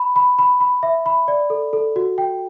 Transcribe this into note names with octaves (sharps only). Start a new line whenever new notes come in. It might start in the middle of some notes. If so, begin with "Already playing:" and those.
Already playing: B5
B5
B5
B5
E5
B5
D5
A4
A4
F#4
G5